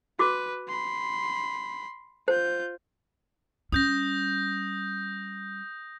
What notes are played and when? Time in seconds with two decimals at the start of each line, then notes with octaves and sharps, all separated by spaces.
0.19 F#4 B4 D6
0.68 B5 C6
2.28 F4 C5 G6
3.72 G3 C#4 D#6 G6 A#6